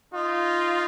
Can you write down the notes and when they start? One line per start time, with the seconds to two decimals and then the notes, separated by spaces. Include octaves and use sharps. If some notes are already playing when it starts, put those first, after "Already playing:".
0.14 D#4 F4